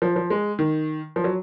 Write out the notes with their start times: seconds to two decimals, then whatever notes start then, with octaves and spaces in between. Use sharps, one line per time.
0.02 F3
0.16 F3
0.30 G#3
0.59 D#3
1.16 F3
1.24 F#3